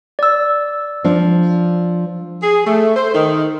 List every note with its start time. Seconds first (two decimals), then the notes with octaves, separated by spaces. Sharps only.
0.19 D5 E6
1.04 F3 D4
2.43 G#4
2.67 A3
2.96 C5
3.14 D#3